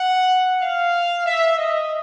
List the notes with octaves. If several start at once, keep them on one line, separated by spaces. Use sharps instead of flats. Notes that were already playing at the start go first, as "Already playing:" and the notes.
Already playing: F#5
F5
E5
D#5